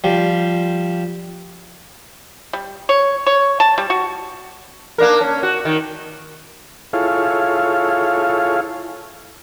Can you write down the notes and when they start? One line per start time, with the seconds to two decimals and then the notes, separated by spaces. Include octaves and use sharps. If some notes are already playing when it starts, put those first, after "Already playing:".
0.04 F3 G3
2.53 G3
2.89 C#5
3.27 C#5
3.60 A5
3.78 G3
3.90 F#4
4.98 A#3 D4 A#4
5.21 C#4
5.43 F#4
5.65 D#3
6.93 E4 F4 G#4 A4 C#5 F5